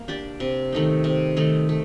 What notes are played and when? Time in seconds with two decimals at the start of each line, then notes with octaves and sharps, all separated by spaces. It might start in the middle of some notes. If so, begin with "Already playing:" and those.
Already playing: A#3
0.08 D4 G4 D5
0.40 C3
0.73 D#3 A3 D#4
1.04 C3
1.37 D#3 A3 D#4
1.69 A3